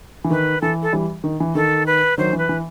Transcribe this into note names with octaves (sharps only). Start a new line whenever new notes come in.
E3
D#3 B4
E3 A4
A4
E3 G3
D#3
E3
D#3 A4
B4
D#3 F#3 C5
E3
B4
E3